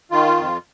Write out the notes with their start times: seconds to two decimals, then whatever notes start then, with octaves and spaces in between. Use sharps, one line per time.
0.11 D#3 F4
0.36 F2